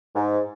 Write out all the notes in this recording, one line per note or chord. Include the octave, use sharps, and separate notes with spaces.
G#2